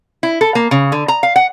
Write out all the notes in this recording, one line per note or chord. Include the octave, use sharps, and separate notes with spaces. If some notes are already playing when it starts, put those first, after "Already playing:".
E4
A4
A#3
C#3
D3
A#5
F5
F#5